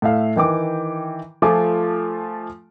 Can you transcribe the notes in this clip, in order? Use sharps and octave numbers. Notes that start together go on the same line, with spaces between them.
A2 E5 F5
D#3 E3 G5 D6
F3 A3 F4 G#5 D6